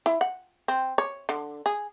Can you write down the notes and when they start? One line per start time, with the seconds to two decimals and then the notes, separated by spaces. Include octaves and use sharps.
0.06 E4
0.21 F#5
0.68 C4
0.98 C#5
1.29 D3
1.66 G#4